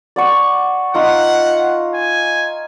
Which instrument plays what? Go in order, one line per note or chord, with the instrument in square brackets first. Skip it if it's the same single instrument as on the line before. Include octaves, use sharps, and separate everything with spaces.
[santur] D5 F#5 C#6
[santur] D#4 F4 [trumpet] F#5
[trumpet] G#5